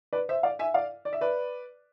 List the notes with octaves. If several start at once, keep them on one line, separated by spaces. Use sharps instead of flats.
B4 D5
C5 E5
D5 F5
E5 G#5
D5 F5
D5
E5
B4 D5